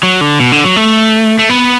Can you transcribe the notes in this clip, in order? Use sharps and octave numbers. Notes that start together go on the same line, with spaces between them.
F#3
D3
B2
D3
F#3
A3
A3
B3